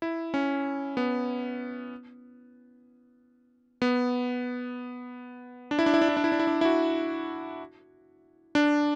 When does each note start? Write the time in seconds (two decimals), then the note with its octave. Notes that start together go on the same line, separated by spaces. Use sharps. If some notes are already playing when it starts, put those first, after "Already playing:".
0.02 E4
0.34 C#4
0.97 B3
3.82 B3
5.71 D4
5.79 E4
5.86 D4
5.94 E4
6.01 D4
6.09 E4
6.17 D4
6.24 E4
6.32 D4
6.39 E4
6.47 D4
6.61 E4
6.65 F#4
8.55 D4